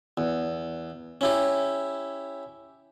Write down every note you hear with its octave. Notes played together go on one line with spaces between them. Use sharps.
E2
C#4 E4 G4